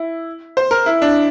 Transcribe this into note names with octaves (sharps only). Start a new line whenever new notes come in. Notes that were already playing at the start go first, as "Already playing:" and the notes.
Already playing: E4
C5
A#4
E4
D4